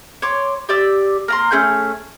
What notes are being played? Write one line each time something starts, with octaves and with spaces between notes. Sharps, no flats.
C#5 C6 D6
G4 D5 E6
A#3 A#5 C6
A3 C#4 G#4 G6